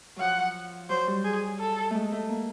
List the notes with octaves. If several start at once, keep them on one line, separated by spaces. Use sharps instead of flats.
F3 F#3 F#5
F#3 C5
G3
G#4
A4
G#3 A3
A3
A#3